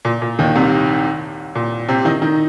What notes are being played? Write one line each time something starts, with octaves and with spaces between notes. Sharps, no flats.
A#2
A#2
D#2 D#3
C2 C3
A#2
C3 C4
D#3 D#4
D#3 D#4